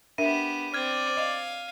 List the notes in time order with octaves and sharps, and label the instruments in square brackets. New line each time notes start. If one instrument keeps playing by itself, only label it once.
[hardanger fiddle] B3 G4 [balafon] D4 A#4 E5 [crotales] D#7
[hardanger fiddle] C4 [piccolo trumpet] D5 [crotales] F6 G#6
[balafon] D#5 [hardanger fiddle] F5